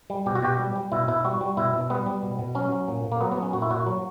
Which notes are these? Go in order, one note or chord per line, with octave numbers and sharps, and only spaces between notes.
G3
B2 G4
F#4
B2 G4
G3
G3
B2 E4
B2 E4
G3 F#4
G3
B2 E4
B2
G3 B3
G3
B2
B2
F#3 C#4
F#3
A#2
A#2
A#3
F#3 B3
B3
F#3
C#4
A#2 F#4
E4
A#2 F#4
F#3